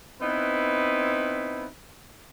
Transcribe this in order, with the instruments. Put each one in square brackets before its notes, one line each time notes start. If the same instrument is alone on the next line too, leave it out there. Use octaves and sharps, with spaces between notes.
[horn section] B3 C4 D#4 E4 B4